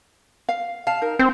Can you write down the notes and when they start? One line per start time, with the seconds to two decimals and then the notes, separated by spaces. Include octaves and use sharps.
0.49 F5
0.87 F5 A5
1.02 D#4 A#4
1.19 C4 C5